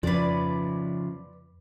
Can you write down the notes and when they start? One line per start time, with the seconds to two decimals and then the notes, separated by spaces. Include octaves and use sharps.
0.03 F2 C#3 F3 B4 D5